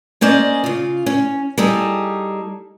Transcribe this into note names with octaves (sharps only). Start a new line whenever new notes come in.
A#3 C#4 C5 D5 D#5 G#5
C#3 F4
C#4
G3 D#4 G#4 A4